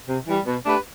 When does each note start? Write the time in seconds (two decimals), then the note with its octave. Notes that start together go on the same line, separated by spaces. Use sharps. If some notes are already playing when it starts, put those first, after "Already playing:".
0.08 C3
0.27 E3 G3
0.45 B2
0.65 A3 D4 G4 B4